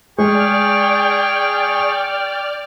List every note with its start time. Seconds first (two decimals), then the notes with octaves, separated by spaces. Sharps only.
0.18 G#3 G#4 D5 G5 C#6 F6